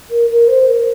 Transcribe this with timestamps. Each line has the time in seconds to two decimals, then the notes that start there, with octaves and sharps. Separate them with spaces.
0.10 A#4
0.30 A#4
0.47 C5
0.67 A#4